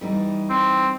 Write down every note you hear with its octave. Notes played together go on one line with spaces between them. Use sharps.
E3 G3 D#4
C4